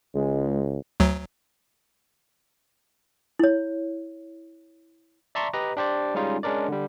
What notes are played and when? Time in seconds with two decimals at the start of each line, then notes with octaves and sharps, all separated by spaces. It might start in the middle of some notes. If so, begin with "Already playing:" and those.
0.14 C#2 G#3
1.00 D2 F#3
3.39 E4 C#5
5.35 D5 E5 A5 A#5 C6 C#6
5.53 G4 B4 D#5 A#5
5.77 D4 G4 C5 D5
6.15 G3 G#3 C#4 D#4 F4 G#4
6.43 G#3 C#4 D4 A#4 D5
6.68 D3 G3